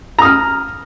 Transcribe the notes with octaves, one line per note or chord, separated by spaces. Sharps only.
A#5 D#6 F6